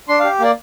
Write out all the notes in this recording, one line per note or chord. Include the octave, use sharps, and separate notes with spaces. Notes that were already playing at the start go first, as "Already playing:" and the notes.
D4 C6
G4 F5
A#3 D5